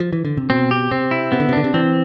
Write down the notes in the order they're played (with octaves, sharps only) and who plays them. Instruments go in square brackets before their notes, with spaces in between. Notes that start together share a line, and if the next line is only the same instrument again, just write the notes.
[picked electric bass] F3
E3
D3
C3
[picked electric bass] B2 [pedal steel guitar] C4
[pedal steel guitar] G4
[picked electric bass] C3 [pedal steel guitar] C4
[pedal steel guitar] E4
[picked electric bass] C3 [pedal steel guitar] B3
[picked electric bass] D3
C3
[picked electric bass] D3 [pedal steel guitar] D4
[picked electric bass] C3
[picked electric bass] E3 [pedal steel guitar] C4